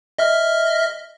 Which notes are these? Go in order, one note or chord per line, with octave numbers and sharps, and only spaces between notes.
D#5 E5 F6